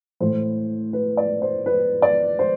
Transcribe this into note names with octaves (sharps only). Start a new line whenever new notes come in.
A2 E3 C5
B4
D5
C5
B4
D5
C5